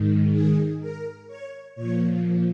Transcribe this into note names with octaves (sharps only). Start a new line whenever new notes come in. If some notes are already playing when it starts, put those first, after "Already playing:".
Already playing: G#2 D#3
G#4
A#4
C#5
A#2 F3 C#5